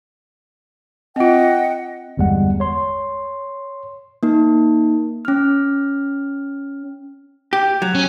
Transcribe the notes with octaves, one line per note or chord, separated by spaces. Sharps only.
C4 F4 D#5 F#5 G5
G1 E2 G3 G#3 F#5
C#5 C6
A#3 D#4
C#4 F6
G4
F#3
C#4